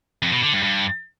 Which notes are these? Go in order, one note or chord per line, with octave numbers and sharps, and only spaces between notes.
F2
B2
D3
G2
G2